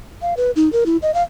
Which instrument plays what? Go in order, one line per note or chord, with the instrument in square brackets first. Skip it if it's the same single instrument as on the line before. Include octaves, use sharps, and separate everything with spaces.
[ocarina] F5
B4
D#4
A#4
E4
D#5
F5